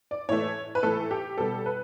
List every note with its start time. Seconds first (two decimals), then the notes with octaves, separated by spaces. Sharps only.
0.11 D5
0.29 A2 E3 A3 C#5
0.75 B4
0.83 A2 E3 A3 A4
1.11 G4
1.38 B2 G3 B3 A4
1.66 B4